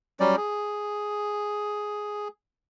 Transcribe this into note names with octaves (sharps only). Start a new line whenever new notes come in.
F#3 G3 C#4 D5
G#4